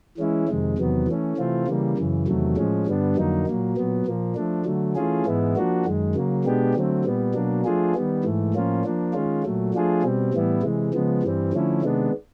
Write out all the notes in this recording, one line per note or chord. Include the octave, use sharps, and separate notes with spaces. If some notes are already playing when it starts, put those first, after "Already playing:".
E3 G#3 C#4 E4
F2 C3 D#3 G#3
E2 C3 D#3 F#3 B3
E3 A3 C#4
C3 E3 A3 C4 F4
C#3 E3 G3 A#3
F#2 C#3 E3
E2 C3 D#3 F#3 A3
A2 F3 G#3 C#4
G2 D3 G3 B3 D4
F2 D3 F#3 A#3 D#4
A#2 F#3 A#3
A#2 F#3 B3
A#2 F3 A#3
F3 A3 D4
D3 F#3 A3
E3 A3 C#4 F4 G#4
G#2 E3 G#3 B3 E4
F3 A#3 D4 F#4
F#2 D#3 G#3
C#3 F#3 A#3
B2 G#3 B3 D4 G4
D3 F#3 A3 C4
A#2 G3 B3
B2 F#3 A#3 D4
F3 A3 D4 F4 G#4
D#3 G3 B3
G#2 E3 A3
A2 F3 A#3 C#4 F4
F3 A#3 D4
D#3 G#3 C#4 F4
A#2 F#3 A3
F3 A3 D4 F4 G#4
B2 G3 C4
A2 E3 G3 B3 E4
C3 E3 G#3
C#3 F3 G#3 B3
G2 E3 G3 C4
D3 F3 A3 C#4 E4
C3 D#3 G#3 B3 D4